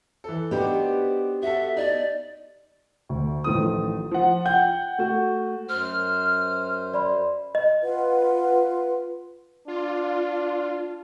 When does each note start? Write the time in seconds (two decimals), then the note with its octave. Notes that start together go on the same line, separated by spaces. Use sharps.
0.24 E3 A4
0.51 B3 D4 D#4 F#4 G4 C5
1.42 F#4 A4 E5
1.76 D#4 D5
3.09 D2
3.44 A1 D#3 F3 A3 D#6
4.11 F3 F#5
4.46 F#5 G5 G6
4.98 A3 F#4
5.69 F#2 C5 F6
6.94 D5 B5 C6
7.55 D#5
7.82 F4 B4 F#5
9.68 D4 F4